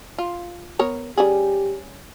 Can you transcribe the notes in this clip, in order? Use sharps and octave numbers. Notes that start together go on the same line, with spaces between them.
F4
B3 A#4 C#5
G3 C#4 G4 G#4